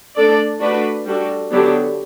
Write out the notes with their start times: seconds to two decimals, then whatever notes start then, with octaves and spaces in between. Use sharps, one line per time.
0.16 A3 D4 A4 D5
0.60 A3 D4 F#4 B4 D5
1.06 G3 D4 F#4 A4
1.51 D3 F#3 B3 D4 G4